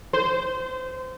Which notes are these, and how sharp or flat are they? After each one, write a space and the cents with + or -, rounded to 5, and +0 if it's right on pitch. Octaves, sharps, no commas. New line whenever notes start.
C5 -25